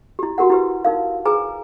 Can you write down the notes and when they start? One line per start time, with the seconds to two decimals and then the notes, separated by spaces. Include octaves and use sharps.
0.19 E4 G4
0.38 F#4 G4 A#4 F#5
0.50 E4 G4 B4
0.85 D#4 A#4 F5
1.25 G#4 B4 G#5 A#5